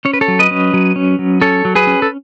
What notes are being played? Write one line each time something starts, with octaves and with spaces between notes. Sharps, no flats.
C#4 C#5
B4
A4 C#5
F#3
B4 D#5
C#4
F#3
C#4
F#3
C#4 A4 C#5
F#3
G#4 B4
C#4
A4